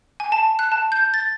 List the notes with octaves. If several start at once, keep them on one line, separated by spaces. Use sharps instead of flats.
G#5
A5
F#6
A5
G6
A6